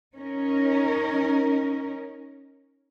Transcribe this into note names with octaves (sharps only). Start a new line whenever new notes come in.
C#4 D#4 A#4